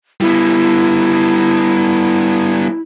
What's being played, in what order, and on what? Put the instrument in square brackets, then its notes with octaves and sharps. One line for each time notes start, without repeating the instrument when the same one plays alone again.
[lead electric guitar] G3 B3 [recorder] E4